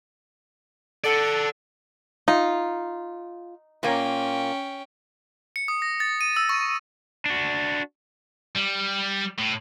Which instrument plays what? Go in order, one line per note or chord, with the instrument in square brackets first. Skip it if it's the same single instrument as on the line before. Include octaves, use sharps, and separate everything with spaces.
[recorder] A4 [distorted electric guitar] D5 F#5
[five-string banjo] D#4 [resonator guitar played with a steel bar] F4
[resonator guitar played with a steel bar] A#2 A#3 [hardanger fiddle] C#4 G5
[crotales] C#7
D#6
A#6
A6
D#7
E6
C#6
[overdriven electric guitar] D4 F#4
[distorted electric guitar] G3
A2